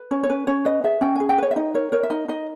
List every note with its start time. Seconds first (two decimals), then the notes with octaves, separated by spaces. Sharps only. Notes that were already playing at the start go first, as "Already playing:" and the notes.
Already playing: B4
0.11 C#4 C#5
0.23 C#5
0.30 C#4 B4
0.47 C#4 C#5
0.65 B4 D#5
0.84 G#4 E5
1.01 C#4 G5
1.16 G#4 G#5
1.29 G5
1.38 B4 C#5
1.51 E5
1.56 D#4 D#5
1.74 A#4 C#5
1.92 A#4 C#5
2.03 E5
2.10 D#4 D#5
2.28 D#4 D#5